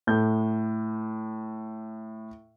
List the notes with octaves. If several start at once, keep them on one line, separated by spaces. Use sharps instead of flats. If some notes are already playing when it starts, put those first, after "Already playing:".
A2 G6